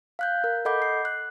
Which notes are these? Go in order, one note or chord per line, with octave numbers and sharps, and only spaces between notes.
F5 F#6 G6
A#4
A4 D#5 F#5 B5 D6 G6
C7
F#6